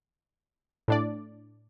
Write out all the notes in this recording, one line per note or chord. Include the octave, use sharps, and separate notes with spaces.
A2 D4 D5